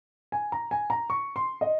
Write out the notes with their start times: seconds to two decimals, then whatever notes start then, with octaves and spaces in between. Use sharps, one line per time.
0.32 G#5
0.52 A#5
0.71 G#5
0.90 A#5
1.10 C#6
1.36 C6
1.61 D#5